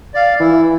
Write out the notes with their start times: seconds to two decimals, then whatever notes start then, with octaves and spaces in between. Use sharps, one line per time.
0.14 D5 F5
0.40 E3 E4